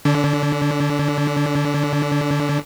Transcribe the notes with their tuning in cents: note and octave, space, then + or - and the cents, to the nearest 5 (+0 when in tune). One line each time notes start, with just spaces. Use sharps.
D3 +0 D4 -40